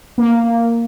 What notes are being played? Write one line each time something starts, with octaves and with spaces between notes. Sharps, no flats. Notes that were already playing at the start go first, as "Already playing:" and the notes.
A#3